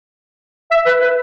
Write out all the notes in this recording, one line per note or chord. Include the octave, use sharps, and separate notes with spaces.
E5
B4
B4